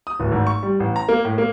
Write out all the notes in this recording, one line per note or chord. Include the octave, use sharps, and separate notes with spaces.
D#6
D1
G#1
C#6
G3
A1
A#5
A#3
A2
A#3